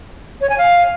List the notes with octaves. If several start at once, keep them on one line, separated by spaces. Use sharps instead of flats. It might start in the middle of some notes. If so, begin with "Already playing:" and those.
C#5
G#5
F5